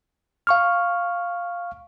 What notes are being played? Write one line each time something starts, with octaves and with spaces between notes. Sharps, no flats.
F5 C#6 F6